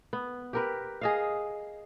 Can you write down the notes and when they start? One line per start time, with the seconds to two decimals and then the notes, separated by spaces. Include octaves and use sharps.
0.13 B3
0.53 G4 A#4 B4
1.01 G#4 D#5 F5